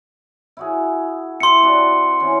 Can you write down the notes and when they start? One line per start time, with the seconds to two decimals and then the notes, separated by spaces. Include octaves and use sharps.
0.57 E4 F#4 G#4
1.40 E4 G4 C6 C#7
1.63 C4 D4 F#4
2.20 E3 C#4